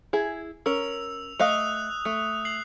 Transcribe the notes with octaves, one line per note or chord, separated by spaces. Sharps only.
E4 G#4
C#4 A#4 E6 F7
A3 D#5 F5 D#6 F#6 F7
A3
C7 F#7